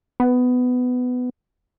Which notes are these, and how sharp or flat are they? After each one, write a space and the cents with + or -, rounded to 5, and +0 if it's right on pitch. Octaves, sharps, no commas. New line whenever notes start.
B3 +15